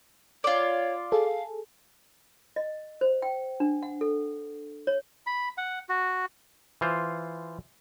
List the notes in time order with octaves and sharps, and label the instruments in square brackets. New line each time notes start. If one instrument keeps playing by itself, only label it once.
[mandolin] F4 D5 [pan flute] C#5
[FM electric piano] G#4 A4 [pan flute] F5
[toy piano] D#5
C5
G5
D4
F#5
A4
C#5
[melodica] B5
F#5
F#4
[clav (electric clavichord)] E3 F4 C5